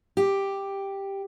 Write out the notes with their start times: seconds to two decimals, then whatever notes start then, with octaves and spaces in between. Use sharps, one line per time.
0.17 G4